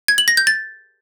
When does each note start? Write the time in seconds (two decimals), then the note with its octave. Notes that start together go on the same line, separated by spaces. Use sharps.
0.08 G#6
0.18 F#7
0.28 A#6
0.37 G6
0.47 A6